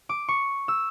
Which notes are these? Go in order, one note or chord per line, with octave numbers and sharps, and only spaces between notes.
D6
C#6
E6